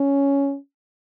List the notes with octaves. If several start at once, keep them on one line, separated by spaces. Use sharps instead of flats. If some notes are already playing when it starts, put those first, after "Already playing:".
Already playing: C#4